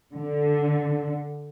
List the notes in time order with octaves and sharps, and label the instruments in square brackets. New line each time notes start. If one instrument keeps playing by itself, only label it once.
[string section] D3